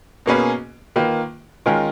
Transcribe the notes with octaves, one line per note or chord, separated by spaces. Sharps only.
B2 A#3 C#4 G#4 B4
D#3 A#3 F4 B4
D#3 G#3 C#4 F4 A#4